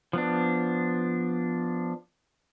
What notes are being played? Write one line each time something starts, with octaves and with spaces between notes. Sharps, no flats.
F3 B3 D4